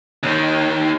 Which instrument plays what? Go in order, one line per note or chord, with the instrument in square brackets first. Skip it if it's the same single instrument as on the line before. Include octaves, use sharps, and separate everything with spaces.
[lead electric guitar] D#2 D#3